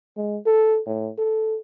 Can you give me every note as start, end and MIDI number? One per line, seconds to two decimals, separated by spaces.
0.17 0.38 56
0.46 0.80 69
0.87 1.11 45
1.18 1.58 69